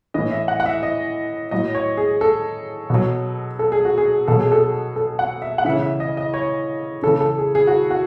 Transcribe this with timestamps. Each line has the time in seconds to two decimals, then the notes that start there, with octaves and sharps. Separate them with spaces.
0.14 A2 E3 D#5
0.31 E5
0.48 F#5
0.60 F#5
0.66 E5
0.83 D#5
1.51 A2 F#3 D#5
1.75 C#5
1.97 G#4
2.21 A4
2.90 B2 F#3
3.59 A4
3.72 G#4
3.85 F#4
3.98 G#4
4.28 B2 F#3 A4
4.40 G#4
4.52 A4
4.96 A4
5.19 F#5
5.42 E5
5.58 F#5
5.65 C#3 E3 E5
5.82 E5
6.00 D#5
6.17 D#5
6.34 C#5
7.03 C#3 E3 A4
7.21 A4
7.38 G#4
7.55 G#4
7.67 F#4
7.90 F#4